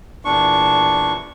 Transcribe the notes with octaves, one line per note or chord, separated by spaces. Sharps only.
E2 A#2 D4 C#6